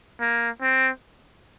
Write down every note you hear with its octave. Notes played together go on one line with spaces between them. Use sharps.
A#3
C4